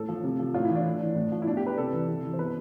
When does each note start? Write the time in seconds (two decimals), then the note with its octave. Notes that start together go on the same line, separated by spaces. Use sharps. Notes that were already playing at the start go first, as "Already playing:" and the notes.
Already playing: A2 A4
0.09 F3
0.23 C3
0.39 F3
0.54 A2 F4
0.65 E3 E4
0.75 D4
0.85 A2
1.00 E3
1.15 A2
1.32 F3
1.42 E4
1.47 B2 D4
1.57 G4
1.67 B4
1.78 C3 A4
1.93 E3
2.08 C3
2.23 E3
2.33 C5
2.38 B2 B4